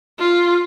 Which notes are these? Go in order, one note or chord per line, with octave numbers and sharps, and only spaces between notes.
F4